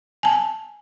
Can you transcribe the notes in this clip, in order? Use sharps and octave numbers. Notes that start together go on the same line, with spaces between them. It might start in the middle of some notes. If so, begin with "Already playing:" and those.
G#5 A5